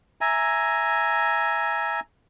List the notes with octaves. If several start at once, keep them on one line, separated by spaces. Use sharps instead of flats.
E5 G#5 A#5